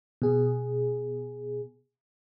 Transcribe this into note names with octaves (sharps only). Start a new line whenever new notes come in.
B2 G#4